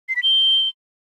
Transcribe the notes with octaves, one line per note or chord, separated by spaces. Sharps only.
C7
B6
G7